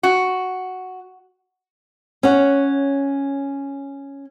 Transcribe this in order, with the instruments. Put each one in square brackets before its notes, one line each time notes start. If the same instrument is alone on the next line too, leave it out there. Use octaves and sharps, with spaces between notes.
[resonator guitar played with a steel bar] F#4
[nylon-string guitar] C#4 C#5 F#5